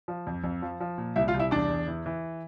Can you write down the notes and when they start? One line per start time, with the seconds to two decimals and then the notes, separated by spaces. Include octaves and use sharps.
0.08 F3
0.27 F2
0.44 F2
0.62 F3
0.80 F3
0.98 A#2
1.16 C2 E4 E5
1.28 F4 F5
1.34 C2
1.39 E4 E5
1.51 E2 D4 D5
1.69 E2
1.87 E3
2.06 E3